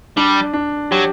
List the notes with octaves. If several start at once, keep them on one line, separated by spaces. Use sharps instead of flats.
G3 D4
D4
F#3 G4